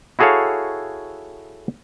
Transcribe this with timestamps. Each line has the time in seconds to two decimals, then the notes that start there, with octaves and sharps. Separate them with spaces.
0.19 E4 F#4 G#4 A4 C#5 F5